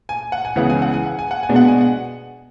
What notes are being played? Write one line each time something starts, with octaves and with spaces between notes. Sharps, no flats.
G#5
F#5
G#5
C#2 C#3 E3 B3 F#5
G#5
F#5
G#5
F#5
G#5
F#5
G#5
B2 G#3 B3 D4
F#5
G#5
F#5